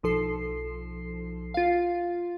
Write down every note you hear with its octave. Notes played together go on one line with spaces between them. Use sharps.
B1 F3 A4 C7
F4 F5